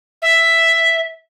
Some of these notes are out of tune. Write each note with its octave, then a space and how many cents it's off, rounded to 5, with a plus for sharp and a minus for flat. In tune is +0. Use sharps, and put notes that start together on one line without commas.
E5 +5